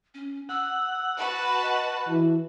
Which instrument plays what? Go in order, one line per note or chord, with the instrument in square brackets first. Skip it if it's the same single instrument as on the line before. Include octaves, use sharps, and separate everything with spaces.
[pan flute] C#4
[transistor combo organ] F#5 [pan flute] E6
[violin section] F#4 B4 A5 [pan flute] B5
[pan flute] D#5
[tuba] E3 [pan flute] F#4